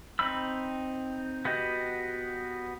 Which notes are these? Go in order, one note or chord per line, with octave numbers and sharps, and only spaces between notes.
C4 D#4 B5 E6
B3 F#4 G4 D#5